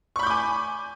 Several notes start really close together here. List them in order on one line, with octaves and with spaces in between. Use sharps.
C#6 B5 G6 D6 G#5